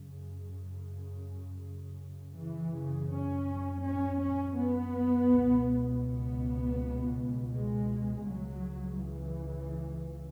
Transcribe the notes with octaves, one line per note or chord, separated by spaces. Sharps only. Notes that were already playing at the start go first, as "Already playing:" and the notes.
Already playing: F#2 C#3
F#2 C#3 E3
C#3
C#4
C#4
C#4
B3
C#2 B2
B3
G#3
C#2 C#3 F#3
E3